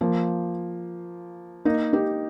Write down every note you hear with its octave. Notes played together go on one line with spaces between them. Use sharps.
F3 A#3
A#3 D#4
D#4 G4